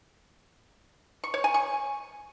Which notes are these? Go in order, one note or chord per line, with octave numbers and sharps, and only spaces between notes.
C#6
C#5
G#5
C#6